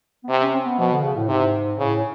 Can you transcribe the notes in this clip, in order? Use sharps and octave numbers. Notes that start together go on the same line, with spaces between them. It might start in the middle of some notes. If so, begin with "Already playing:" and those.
B3
C3 C4
C#4
C4
B3
B2 F3
D3
C#3
A2
G#2 C3
A2 C#3